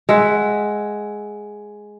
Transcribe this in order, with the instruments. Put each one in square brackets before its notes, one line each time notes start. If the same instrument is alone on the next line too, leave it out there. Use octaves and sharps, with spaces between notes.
[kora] G#3 E5 F#5